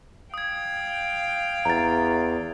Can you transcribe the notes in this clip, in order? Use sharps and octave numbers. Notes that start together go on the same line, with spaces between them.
F5 G5 D#6 G#6
E2 A#5 A6